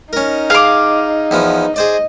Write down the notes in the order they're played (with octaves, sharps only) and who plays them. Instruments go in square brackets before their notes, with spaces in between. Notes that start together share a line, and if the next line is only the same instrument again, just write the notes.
[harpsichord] C#4 A#4 [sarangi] D#4
[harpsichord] G#4 [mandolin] F5 D6
[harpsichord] E2 F3 B3
[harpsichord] G#4 C5 D5 [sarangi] D#5